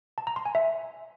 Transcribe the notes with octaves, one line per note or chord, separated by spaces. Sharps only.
A5
A#5
C6
G#5
E5